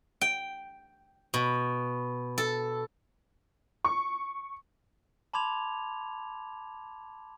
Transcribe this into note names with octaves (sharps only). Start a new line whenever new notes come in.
G5
B2
A4
C#6
A5 B5 C6 D6 G#6 F7